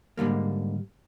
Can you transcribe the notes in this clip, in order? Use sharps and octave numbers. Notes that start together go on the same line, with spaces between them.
G#2 D3 G3 A#3